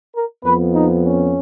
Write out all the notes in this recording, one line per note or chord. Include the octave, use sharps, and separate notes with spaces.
A#4
F2 F3 B3 B4
D#4
C#4